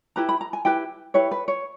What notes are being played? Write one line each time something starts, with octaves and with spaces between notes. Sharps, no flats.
E4 G4 B4 A#5
B5
A#5
G#5
E4 G4 B4 G5
E4 G4 B4 C#5
B4
C#5